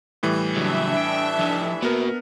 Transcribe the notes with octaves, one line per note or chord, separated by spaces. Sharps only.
A2 E3 G3
C#3 F#3 D4 E5
G5
F3 D#4
A#3 B3 F#4 A#4